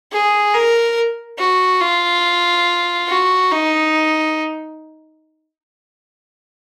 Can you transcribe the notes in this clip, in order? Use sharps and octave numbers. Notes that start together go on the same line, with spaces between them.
G#4
A#4
F#4
F4
F#4
D#4